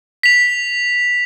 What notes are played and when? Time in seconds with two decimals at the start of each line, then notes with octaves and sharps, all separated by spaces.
0.23 B6 F7